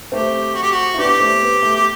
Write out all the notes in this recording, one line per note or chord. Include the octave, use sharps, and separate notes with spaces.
A3 C4 G4
F#4
G4
F#4
E4
B3 D4 G4
A3 C4
B3
A3
G4